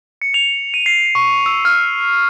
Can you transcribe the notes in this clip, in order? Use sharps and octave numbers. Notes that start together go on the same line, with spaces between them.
C#7
F7
D#7
C7
C#6
E6
F6